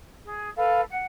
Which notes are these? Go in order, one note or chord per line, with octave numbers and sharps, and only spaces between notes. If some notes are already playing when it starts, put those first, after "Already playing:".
G#4
A4 B4 F5
F#5